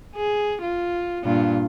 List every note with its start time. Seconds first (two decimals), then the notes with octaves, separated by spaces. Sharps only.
0.16 G#4
0.62 F4
1.24 G2 A#2 F4